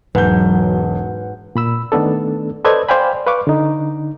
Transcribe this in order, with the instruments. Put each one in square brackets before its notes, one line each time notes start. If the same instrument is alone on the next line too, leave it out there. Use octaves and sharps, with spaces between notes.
[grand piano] E1 G6 [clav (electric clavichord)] G#2 [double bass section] F#3 [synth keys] B4 F#5
[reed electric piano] A#2 B5 E6
D#3 A3 B3 D4 A4
A4 B4 C5 D5 D#5 G#6
C5 D5 F5 G5 G#5 B5
B4 F5 C#6 D6
D3 D#4